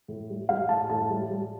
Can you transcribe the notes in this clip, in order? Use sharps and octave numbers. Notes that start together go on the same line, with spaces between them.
A2
G3
G3 F5
A2 A5
A2 A5
G3
G3